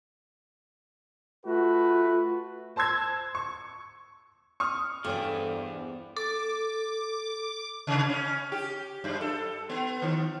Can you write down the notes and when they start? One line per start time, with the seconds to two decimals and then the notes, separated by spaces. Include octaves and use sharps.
1.45 A3 F4 F#4 B4
2.76 C5 A5 C6 E6 G#6
3.35 C#6
4.60 C#6 D#6 F6
5.05 E2 G2 G#4 A4 C5 D5
6.17 A4 D6
7.87 C3
8.09 C#4
8.52 G4
9.04 F#2
9.21 A4
9.70 B3
10.02 D#3